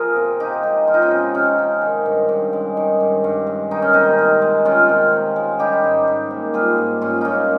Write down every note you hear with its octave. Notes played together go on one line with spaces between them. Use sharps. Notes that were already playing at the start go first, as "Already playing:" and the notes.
Already playing: F3 F4 G#4 A#4
C3
C3 D#4 G4
G#3
F3 F4
D#4
C#4 F4
C3
C3 C#4
G#3
D#3
G2
G2
G#3
D#3
G2
G2
G#3
D#3 D#4
C#4
C3 D#4
C3
G#3
D#3 C#4 F4
C3
C3
G#3
G3 D#4 G4
G#2
G#2
A#3
G3 F4 G#4
G#2
G#2 C#4 F4
A#3 C#4 D#4